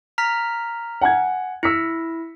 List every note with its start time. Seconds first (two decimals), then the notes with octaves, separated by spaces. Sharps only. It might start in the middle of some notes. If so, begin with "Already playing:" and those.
0.18 A#5 F6 B6
1.01 F#5 G#5 G#6
1.63 E4 E6 B6 C#7